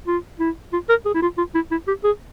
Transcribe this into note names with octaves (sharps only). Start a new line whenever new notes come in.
F4
E4
F4
A#4
G#4
E4
F4
F4
E4
E4
G4
G#4